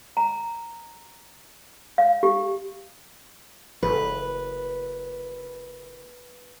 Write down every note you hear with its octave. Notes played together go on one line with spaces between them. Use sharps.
A#5
F5
G4
F#1 B4